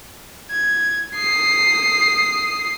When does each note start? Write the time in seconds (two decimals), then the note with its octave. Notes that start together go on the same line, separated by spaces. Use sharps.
0.51 G#6
1.16 D#6 C7